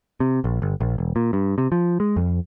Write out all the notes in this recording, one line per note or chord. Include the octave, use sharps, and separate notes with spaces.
C3
A#1
G1
A#1
E1
A#2
G2
C3
F3
G#3
F2